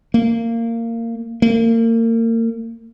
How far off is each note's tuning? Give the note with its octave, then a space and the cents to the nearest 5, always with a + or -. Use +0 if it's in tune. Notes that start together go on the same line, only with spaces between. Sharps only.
A#3 -20
A#3 -35